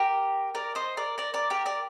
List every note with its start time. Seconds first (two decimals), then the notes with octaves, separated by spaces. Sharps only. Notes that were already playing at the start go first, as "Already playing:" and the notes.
Already playing: G4 A#4
0.55 A#4 D5
0.75 C5 D#5
0.97 A#4 D5
1.18 A#4 D5
1.34 A#4 D5
1.50 G4 A#4
1.66 A#4 D5